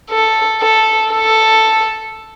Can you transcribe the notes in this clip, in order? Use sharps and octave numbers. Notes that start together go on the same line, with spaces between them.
A4
A4
A4